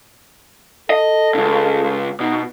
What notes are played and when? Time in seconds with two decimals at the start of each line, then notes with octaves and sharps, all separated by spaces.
0.90 A4 D#5
1.34 C#2 G2
2.20 B2 D#4